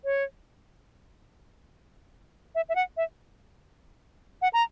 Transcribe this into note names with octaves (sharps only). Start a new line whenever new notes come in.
C#5
E5
E5
F#5
E5
F#5
A#5